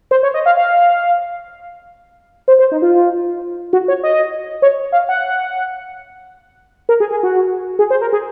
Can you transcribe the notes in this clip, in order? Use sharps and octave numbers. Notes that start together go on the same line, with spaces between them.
C5
C#5
D#5
F5
F5
C5
C5
D#4
F4
F#4
C#5
D#5
C#5
F5
F#5
A#4
G#4
G#4
F#4
G#4
C5
A#4
G#4